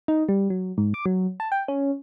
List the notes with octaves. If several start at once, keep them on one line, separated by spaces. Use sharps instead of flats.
D#4
G3
F#3
G#2
D6
F#3
A5
G5
C#4